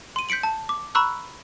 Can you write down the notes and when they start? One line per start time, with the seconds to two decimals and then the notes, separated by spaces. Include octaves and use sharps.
0.16 C6 D#7
0.29 G6 B6 C#7 D7 F#7
0.43 A5
0.69 D6
0.95 A#5 B5 C#6 E6 F#6